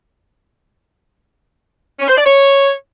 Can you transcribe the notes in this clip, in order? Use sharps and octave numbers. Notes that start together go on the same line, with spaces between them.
C#4
C5
D5
C#5